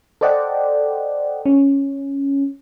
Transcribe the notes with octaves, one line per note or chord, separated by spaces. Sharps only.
A4 C5 D5 D#5 F#5 G5
C#4